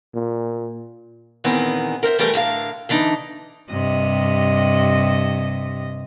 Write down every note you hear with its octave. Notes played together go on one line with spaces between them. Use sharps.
A#2
E2 A#2 D#3 E3 B3 C4
A#4 C5 D#5 E5
E3 F3 G3 A3 G4 A#4
A2 D3 A#4 F5
D3 E3 D4 D#4
G2 C3 D#5